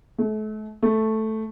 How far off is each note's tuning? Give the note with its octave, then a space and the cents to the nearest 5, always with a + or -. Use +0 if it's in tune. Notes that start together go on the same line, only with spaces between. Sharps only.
A3 -40
A3 -5